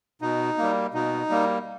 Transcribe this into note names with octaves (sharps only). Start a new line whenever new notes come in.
B2 D#4
G3 A#3
B2 D#4
G3 A#3